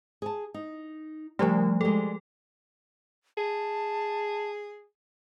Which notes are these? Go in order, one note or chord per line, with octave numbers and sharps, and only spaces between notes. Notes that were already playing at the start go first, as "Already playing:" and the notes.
G#4 A5
D#4
C#3 F3 G3 A3 G4
G3 G#3 A4
G#4 A5